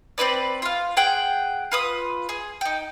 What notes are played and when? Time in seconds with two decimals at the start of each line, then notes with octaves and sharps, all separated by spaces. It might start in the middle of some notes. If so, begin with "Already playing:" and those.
0.18 C4 D#4 B4 D5
0.62 F4 F5
0.97 G#4 F#5 G5
1.72 F4 B4 D#6
2.29 G#4
2.61 D#4 G5